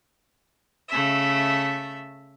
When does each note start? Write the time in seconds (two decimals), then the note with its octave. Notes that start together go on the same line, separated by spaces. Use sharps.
0.90 C#3 A3 E5